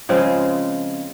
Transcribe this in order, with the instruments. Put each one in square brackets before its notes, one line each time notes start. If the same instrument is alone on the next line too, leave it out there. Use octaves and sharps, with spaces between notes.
[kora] C#3 F3 G#3 C4